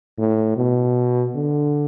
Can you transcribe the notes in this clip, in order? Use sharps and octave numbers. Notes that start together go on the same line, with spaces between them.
A2
B2
D3